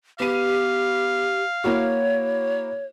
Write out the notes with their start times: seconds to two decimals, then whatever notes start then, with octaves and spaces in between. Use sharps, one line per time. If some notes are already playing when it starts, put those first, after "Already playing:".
0.20 B3 G4 F5 D#7
1.64 A#3 E4 F#4 C#5